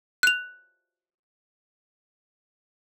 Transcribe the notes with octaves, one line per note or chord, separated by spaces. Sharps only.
F#6 F7